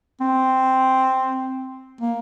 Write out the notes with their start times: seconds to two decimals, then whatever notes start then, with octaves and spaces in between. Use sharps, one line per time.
0.21 C4
2.01 A#3